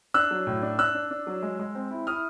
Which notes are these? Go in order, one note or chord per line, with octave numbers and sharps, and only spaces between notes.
D4 E6 F#6
F#3
A2
D4
D4 E6 F#6
D4
D4
F#3
G#3
G#3
C4
E4
E4 D#6 F6